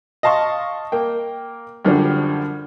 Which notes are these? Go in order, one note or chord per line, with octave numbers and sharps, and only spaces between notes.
D#5 F5 A5 C6 C#6
A#3 G5
F#2 D3 F3 G3